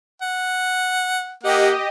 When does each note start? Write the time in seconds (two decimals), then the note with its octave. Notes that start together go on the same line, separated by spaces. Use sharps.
0.22 F#5
1.43 A#3 G4 D#5 F#5